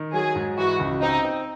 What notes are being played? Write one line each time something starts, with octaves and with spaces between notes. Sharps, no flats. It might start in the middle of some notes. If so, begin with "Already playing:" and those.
Already playing: D#3
F#3 G#4
G#2
E3 F#4
C#2
C4 D#4
C4